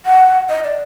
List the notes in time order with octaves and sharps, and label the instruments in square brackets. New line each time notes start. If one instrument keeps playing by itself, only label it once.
[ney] F#5
D#5
D5